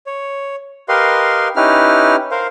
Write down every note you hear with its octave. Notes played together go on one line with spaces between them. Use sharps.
C#5
G4 A#4 B4 D#5 F5 C6
C#4 D#4 E4 G4 B4 F6
A#4 C5 F5